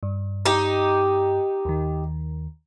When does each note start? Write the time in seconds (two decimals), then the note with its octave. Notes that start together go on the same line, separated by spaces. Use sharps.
0.03 G2
0.46 D#4 G4
1.65 D#2 D#3